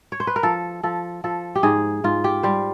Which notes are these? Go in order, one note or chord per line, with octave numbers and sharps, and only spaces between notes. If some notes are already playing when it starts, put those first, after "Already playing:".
C#5
C5
B4
A#4
F3 A4
F3 A4
F3 A4
G4
G#2 G#4
G#2 F4
G4
G3 C5